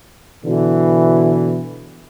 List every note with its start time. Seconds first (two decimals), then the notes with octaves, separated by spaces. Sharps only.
0.45 B2 D3 E3